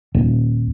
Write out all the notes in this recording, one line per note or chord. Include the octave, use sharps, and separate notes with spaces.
D#1